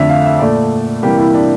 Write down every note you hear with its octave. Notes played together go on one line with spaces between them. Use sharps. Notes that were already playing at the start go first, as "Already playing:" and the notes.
Already playing: F2 D3 A3 D5 E5
F5
E5
A#2 A3 D5
C3 E3 G3 A#3 G4
E4
D4